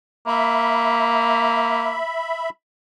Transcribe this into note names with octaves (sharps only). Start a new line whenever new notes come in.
A#3 E5 B5